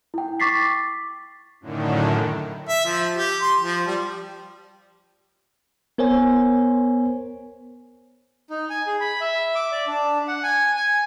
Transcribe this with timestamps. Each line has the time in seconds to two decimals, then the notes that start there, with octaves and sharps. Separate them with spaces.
0.14 E4 G5
0.40 C#6 D6 A6 B6 C7
1.61 F#2 A2 D3 D#3
2.68 E5
2.85 F3
3.16 G4
3.42 C6
3.61 F3
3.87 G3
5.98 B3 A#4 C5 C#5 G#5
8.50 D#4
8.70 G#5
8.87 G#4
9.00 B5
9.21 E5
9.55 D6
9.72 D5
9.87 D4
10.28 F#5
10.43 G#5
10.77 G#5